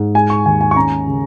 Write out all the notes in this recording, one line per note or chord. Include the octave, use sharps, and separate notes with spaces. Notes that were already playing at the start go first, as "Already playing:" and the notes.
Already playing: G#2
G#3 G#5
C#6
D#2 G#5
G#5
C#6
C#4 A#5
C#3